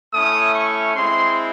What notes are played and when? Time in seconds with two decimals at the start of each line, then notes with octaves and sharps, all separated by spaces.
0.14 A3 C#4 E4 D#6
0.54 C#6
0.94 G#3 C4 E4 C6